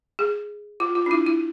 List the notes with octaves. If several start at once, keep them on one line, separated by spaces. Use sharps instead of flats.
G#4
F4
F4
D4
E4
E4